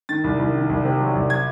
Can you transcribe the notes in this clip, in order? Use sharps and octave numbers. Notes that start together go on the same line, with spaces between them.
D#3 A6
C2
C2
D#3
C2
C3
F#3
C2
G#6